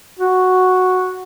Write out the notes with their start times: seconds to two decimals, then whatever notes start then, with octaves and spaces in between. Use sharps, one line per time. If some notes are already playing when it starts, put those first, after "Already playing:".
0.19 F#4